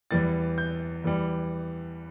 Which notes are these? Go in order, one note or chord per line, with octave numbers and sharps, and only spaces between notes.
E2 E3 G3 A6
G6
E2 E3 G3